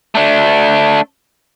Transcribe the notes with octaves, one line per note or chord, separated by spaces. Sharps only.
A3 D4